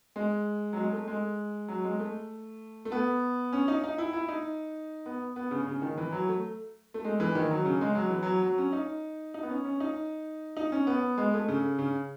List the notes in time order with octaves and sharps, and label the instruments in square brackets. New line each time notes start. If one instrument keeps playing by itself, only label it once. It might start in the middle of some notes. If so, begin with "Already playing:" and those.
[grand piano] G#3
F#3
G#3
A3
G#3
F#3
G#3
A3
A3
B3
C#4
D#4
D#4
E4
E4
D#4
B3
B3
C#3
C#3
D#3
E3
F#3
A3
A3
G#3
E3
D#3
F#3
C#3
G#3
F#3
E3
F#3
F#3
C#4
D#4
D#4
B3
C#4
C#4
D#4
D#4
C#4
B3
G#3
A3
C#3
C#3